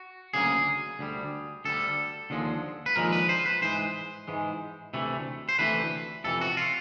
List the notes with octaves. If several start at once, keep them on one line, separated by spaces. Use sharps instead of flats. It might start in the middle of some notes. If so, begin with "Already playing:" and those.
Already playing: F#4
D2 C#3 F#3 A#3 G#4
D2 D3 G3
D2 D3 G3 A4
D#2 D3 F3 G#3
B4
D#2 D3 F3 G#3 A#4
B4
C5
B4
G#2 E3 G#3 C5
G#2 E3 G#3
D2 C3 E3 A3
C5
D2 C3 E3 A3 B4
F2 C3 E3 A4
F#4
F4